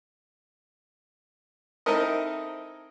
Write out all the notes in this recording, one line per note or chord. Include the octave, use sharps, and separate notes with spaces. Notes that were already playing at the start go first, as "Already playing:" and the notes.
C4 D#4 E4 A4 A#4 D#5